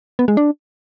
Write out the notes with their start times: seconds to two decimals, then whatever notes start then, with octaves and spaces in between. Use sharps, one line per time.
0.19 B3
0.28 G#3
0.37 D4